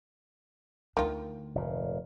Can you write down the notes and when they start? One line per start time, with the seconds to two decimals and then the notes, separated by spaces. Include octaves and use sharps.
0.97 D2 D#3 D4 F4
1.55 F1 A#2